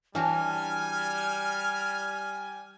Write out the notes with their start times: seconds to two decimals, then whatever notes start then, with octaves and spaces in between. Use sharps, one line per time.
0.15 E3 G3 D4 F#4 G4 G#5 F6